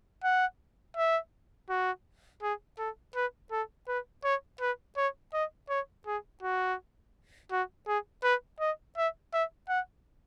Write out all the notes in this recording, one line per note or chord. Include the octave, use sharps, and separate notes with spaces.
F#5
E5
F#4
G#4
A4
B4
A4
B4
C#5
B4
C#5
D#5
C#5
G#4
F#4
F#4
G#4
B4
D#5
E5
E5
F#5